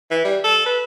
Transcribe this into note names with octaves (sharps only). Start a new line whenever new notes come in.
E3
G3
A4
B4